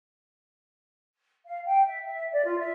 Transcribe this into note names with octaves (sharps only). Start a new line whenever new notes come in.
F5
G5
E5
E5
D5
F4
E5